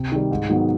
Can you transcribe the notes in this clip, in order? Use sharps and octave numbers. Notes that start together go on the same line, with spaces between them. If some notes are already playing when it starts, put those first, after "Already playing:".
Already playing: C3
D#3 G3
G#2
D#3 F#3 B3